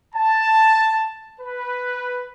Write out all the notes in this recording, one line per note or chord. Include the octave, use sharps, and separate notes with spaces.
A5
B4